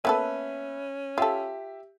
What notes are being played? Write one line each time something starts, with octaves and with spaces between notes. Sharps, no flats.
A#3 B3 C#4 A4 B4 E5
F4 G4 A4 E5